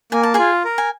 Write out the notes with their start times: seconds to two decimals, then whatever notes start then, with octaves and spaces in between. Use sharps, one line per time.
0.12 A#3 G#5
0.23 A5
0.34 F4 G#4 G#5
0.65 A#4
0.78 G#5